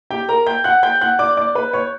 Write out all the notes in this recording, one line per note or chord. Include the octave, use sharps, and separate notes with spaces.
G4 G5
A#4 A#5
G5 G6
F#5 F#6
G5 G6
F#5 F#6
D5 D6
D5 D6
B4 B5
C#5 C#6